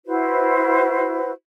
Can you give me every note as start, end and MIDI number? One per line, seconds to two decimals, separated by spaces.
0.06 1.31 64
0.06 1.31 66
0.06 1.31 71
0.06 1.31 72